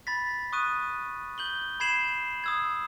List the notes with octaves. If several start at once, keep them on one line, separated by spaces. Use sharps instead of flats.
B5 A6 B6
C#6 D#6 F#6 D#7
G6 F#7 G7
B5 G#6 C7 E7 F#7
D#6 E6 G#6